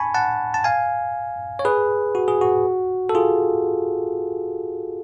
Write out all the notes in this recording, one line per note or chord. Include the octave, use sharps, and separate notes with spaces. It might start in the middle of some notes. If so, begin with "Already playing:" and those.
Already playing: G#5 A5 B5 C#6
F#5 A5
A5
F5 G#5
C#5
G#4 B4
F#4
G#4
F#4
A4
F4 G#4